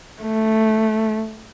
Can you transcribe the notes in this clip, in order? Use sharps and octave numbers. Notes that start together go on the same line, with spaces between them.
A3